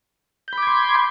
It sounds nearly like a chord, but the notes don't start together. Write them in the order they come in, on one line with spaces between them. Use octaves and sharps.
G6 B5 D6 G#6 C6